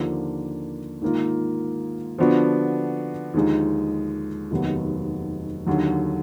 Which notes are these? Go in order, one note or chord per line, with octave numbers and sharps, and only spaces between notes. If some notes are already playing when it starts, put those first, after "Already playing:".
Already playing: D#2 D3 F3 A#3 D4
G#2 D#3 A#3 F4
D3 F3 B3 D4 F#4
D#2 D3 F3 G#3 D#4
F1 D#2 D#3 F#3 B3
D#2 D3 F#3